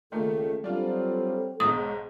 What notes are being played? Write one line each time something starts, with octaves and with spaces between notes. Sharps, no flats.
C#2 D#3 A3 A#3 A4
F#3 G3 C4 D4 F4 A4
B1 G#2 D#6